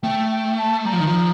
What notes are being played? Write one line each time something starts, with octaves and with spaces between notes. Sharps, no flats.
A3 G5
G5
A5
G3 A#5
F3
D#3
F3